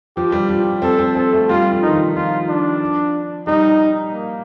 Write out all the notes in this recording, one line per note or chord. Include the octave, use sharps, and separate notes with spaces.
F3 G4
G3
F3 G4
C4 A4
C4
C4 A4
A3
G3 F4
F3
D#3 D#4
F3
F3 F4
D4
G3 D#4
A#3